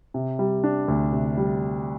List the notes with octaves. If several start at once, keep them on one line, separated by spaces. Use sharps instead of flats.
C3
G3
D4
D2
C3
G3